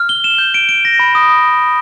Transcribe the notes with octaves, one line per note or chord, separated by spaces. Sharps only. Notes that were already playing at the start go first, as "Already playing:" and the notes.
Already playing: F6
G7
E7
G6
D7
D7
A#6
B5
D#6